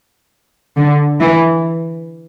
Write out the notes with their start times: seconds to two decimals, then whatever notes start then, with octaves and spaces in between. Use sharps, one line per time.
0.77 D3
1.20 E3